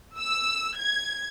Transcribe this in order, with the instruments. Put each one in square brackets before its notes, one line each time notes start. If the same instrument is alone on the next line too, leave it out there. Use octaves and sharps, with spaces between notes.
[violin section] E6
G#6